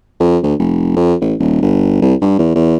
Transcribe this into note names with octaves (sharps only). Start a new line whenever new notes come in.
F2
D2
F1
F2
A1
D#1
G1
C2
G2
E2
E2